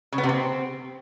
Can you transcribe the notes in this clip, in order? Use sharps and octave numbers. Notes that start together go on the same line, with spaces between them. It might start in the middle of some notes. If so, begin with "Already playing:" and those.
C#3
B3
C3
C4